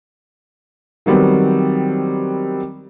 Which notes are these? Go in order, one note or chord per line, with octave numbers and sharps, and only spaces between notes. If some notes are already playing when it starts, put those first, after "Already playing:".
D#3 F#3 G3 B3 C4